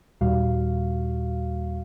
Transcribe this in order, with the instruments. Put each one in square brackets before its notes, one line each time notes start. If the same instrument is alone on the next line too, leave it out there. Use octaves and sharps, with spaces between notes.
[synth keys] D#2 A#2 G3 F#4 F5